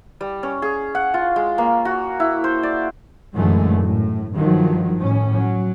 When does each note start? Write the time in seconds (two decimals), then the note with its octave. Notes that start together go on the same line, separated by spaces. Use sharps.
0.21 G3
0.43 C#4
0.62 G#4
0.95 F#5
1.14 F4
1.36 G#3
1.58 A#3
1.85 F#4
2.20 E4
2.44 C5
2.63 D5
3.36 F#2 A#2 D3 E3 G#3 A3
3.82 A2
4.35 G2 D#3 F3 F#3
5.00 A2 C#4
5.35 F#3